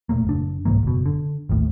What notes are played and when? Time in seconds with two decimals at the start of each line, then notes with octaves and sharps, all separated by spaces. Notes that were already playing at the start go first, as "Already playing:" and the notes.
0.09 E1 A#2 A3 A#3
0.27 F#1 D4
0.65 C2 G#2 E3 A#3
0.83 F#1 B2
1.06 D3
1.49 A1 D#2 A2